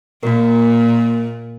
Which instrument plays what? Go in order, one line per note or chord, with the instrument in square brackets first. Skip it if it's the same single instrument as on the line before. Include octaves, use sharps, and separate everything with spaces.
[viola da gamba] A#2 [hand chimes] A#3 A#4